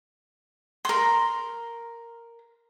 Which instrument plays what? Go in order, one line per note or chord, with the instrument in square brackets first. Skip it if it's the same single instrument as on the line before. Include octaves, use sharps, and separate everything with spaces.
[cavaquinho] A#4 C6